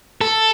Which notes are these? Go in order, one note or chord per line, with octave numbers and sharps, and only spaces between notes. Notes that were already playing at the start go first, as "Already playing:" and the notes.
A4